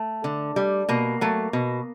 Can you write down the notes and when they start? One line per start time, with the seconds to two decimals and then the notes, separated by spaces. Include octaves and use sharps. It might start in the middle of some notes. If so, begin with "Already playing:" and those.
Already playing: A3
0.24 D3
0.56 G3
0.89 B2 A#3
1.21 F#3 A3
1.53 B2